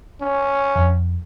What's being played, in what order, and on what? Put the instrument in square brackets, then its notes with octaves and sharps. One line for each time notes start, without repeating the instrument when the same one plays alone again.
[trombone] C#4
[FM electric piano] F2